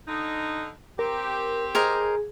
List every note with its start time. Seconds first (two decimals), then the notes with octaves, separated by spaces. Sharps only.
0.07 D3 D#4
0.99 C4 G4 A#4
1.75 G#4 A#4 C5 D#5